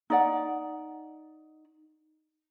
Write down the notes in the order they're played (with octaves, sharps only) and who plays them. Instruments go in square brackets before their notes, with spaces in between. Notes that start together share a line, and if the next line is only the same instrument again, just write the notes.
[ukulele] D#4 D5 F#5